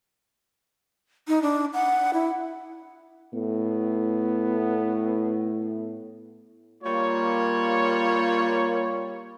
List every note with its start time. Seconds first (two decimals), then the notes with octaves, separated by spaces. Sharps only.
1.28 D#4
1.42 D4
1.73 F#5
2.13 E4
3.34 A2 B3
6.84 G3 A#3 F4 C#5